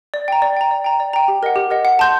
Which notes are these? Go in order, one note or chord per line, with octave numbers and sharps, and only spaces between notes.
D5
G5 A#5
D5
G5 A#5
D5
G5 A#5
D5
G5 A#5
G4
A#4 D#5 F#5
G4
A#4 D#5 F#5
F#5
A5 C6 G6